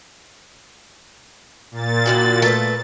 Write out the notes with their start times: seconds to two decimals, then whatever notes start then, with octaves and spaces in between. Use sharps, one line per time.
1.71 A#2 A6
2.06 A2 D3 F#4
2.42 A3 B4